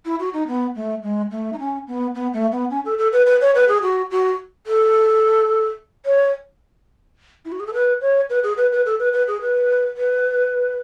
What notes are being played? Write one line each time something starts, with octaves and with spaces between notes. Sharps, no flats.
E4
F#4
D#4
B3
A3
G#3
A3
D#4
C#4
B3
B3
A3
B3
C#4
A4
A4
B4
B4
C#5
B4
G#4
F#4
F#4
A4
C#5
E4
F#4
G#4
A4
B4
C#5
B4
G#4
B4
B4
A4
B4
B4
G#4
B4
B4